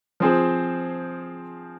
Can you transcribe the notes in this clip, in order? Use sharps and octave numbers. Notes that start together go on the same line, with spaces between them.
F3 C4 G#4 C5